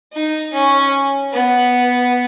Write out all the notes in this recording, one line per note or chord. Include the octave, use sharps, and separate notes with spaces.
D#4
C#4
B3